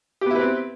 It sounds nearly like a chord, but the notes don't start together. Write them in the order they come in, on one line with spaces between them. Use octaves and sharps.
G4 B3 E4 B4 C4